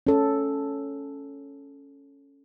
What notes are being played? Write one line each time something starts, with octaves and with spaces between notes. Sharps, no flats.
C#4 A4